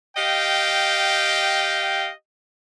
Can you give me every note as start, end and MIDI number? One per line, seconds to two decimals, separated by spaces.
0.17 2.10 67
0.17 2.10 75
0.17 2.10 77
0.17 2.10 79